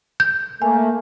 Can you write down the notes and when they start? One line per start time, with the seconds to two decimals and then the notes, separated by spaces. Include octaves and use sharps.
0.20 G6
0.62 A3 A#3 G#5